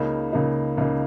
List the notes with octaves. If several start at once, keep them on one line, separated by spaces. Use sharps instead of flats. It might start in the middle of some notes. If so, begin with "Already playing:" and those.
Already playing: C#2 C#3 A#3 D#4
C#2 C#3 A#3 D#4
C#2 C#3 A#3 D#4